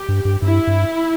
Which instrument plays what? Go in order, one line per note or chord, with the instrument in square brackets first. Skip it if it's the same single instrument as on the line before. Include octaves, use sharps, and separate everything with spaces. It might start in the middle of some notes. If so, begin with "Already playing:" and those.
Already playing: [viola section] G4
[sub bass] G2
G2
[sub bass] G2 [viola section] E4
[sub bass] G2